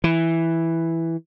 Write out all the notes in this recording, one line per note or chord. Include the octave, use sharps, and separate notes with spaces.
E3